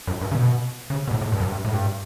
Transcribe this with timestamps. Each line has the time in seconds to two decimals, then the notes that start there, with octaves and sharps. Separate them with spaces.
0.07 F#2
0.21 G2
0.32 C#3
0.35 B2
0.90 C#3
1.07 B2
1.11 A2
1.21 A2
1.32 G2
1.40 F#2
1.49 G2
1.65 A2
1.74 G2